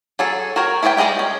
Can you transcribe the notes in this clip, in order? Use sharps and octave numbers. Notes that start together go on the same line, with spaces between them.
F#3 G#4 A4
F#4 A#4 C#5 G5
E4 G#4 B4 D5 G5
G3 G#3 G#4 D#5 G5
C#4